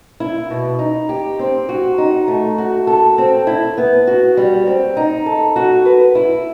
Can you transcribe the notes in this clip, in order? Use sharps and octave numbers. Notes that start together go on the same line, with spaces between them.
E4
B2
D#4
G4
C4
F#4
D#4
A3
F#4
A4
C4
E4
B3
F#4
G3
C4
D#4
A4
F#4
B4
E4